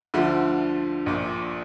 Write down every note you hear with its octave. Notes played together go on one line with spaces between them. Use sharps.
D2 D3 F3 A3
A#1 A#2